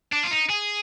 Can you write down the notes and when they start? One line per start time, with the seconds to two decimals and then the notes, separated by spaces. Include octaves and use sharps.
0.12 D4
0.23 F4
0.31 D#4
0.50 G#4